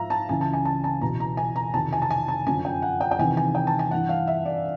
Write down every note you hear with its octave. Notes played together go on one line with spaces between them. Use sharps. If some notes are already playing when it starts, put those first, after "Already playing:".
Already playing: G#2 F3 E5 F5 A#5
A5
C#2 C#3 E3 G#5
A5
G#5
A5
A5
E2 B2 A#5
A#5
G#5
A#5
F2 C3 D#3 A5
G#5
A5
G#5
A5
F#2 D3 F3 G#5
G5
F#5
G5
G5
E2 C3 D#3 G#5
G#5
G5
A5
G#5
G2 E3 F#5
F5
E5
D5